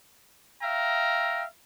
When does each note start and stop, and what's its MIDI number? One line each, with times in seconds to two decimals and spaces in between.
0.62 1.44 76
0.62 1.44 77
0.62 1.44 79
0.62 1.44 82